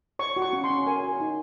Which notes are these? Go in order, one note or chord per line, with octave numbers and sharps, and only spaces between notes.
C#5 C#6
F#4
C#6
C#4
C6
C#4
A#4 G#5
F#4
D#4